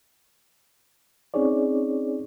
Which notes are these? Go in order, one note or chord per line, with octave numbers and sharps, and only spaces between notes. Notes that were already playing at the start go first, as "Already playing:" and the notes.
C4 C#4 D#4 G#4 C#5 D5